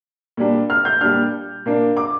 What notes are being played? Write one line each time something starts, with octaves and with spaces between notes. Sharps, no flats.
A#2 G3 D4
F6
G6
A#2 G3 D4 F6
A#2 A#3 D4
D6